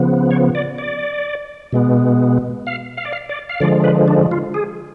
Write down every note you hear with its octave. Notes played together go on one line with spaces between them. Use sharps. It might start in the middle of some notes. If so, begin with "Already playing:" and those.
Already playing: C#3 F3 B3
C#5
D5
D5
B2 G#3 B3
F5
F5
D5
F5
D5
F5
D3 F3 G#3 D5
B4
D4
F4
G#4